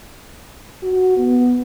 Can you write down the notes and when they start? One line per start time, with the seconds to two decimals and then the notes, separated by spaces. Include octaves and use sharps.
0.83 F#4
1.17 B3